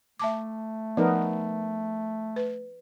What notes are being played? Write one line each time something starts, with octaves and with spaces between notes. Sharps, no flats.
A3 E5 A5 D6
F3 B3 D#4 A#4
B4